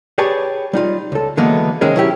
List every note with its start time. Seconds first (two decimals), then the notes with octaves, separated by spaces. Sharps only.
0.18 G4 G#4 B4 C#5 D5 A5
0.73 G3 D#4 F4
1.12 C#2 A4
1.37 D3 E3 F#3 G#3 A#3 B3
1.81 C3 D#3 G#3 C#4 G#4 A#4
1.96 F#3 E4 G4